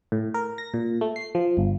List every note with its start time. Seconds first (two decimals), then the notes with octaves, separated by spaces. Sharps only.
0.12 A2
0.34 A#4
0.58 A#6
0.74 A#2
1.01 A3
1.16 C7
1.35 F3
1.57 G1